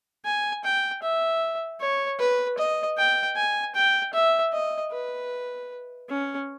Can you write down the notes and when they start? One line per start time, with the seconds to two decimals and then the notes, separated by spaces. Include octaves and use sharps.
0.25 G#5
0.64 G5
1.03 E5
1.80 C#5
2.19 B4
2.58 D#5
2.97 G5
3.36 G#5
3.75 G5
4.14 E5
4.53 D#5
4.92 B4
6.09 C#4